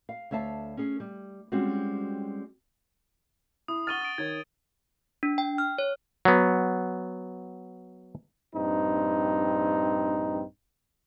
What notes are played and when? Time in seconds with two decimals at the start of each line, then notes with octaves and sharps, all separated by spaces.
0.09 F5
0.31 D2 C#5 E5 F5 A5
0.77 C#4 G#4
1.00 G3
1.52 G3 G#3 C4 C#4 F4 F#4
3.68 E4 D#6
3.87 F#5 C#6 F6 A6 D#7 G7
4.02 D#6 D7
4.18 D#3 C#5 G#6
5.23 D4
5.38 G5
5.58 F6
5.78 C#5
6.25 F#3 B3
8.55 A#1 G2 C4 D#4